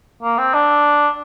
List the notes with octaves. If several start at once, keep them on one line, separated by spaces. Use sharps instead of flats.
A#3
C4
D4